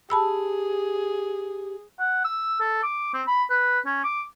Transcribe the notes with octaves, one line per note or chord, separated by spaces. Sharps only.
G4 G#4 A5 B5 E6
F#5
E6
A4
D6
C4
B5
B4
C#4
D6